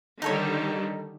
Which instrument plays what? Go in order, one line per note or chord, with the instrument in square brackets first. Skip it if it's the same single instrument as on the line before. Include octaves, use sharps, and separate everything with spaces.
[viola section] D3 D#3 G3 [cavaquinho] D#4 A4 C#5